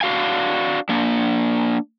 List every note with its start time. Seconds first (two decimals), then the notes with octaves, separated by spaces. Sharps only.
0.01 D4 F#4 F5 G#5
0.89 A#3 D4